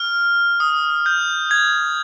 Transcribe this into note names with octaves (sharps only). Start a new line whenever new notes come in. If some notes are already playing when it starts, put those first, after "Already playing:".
Already playing: F6
D#6
G6
G#6